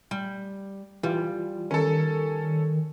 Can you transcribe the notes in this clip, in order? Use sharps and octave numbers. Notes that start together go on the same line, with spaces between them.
G3
E3 G3 F4
D#3 C#4 A4 A#4